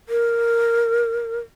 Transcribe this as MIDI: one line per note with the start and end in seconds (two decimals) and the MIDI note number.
0.09 1.39 70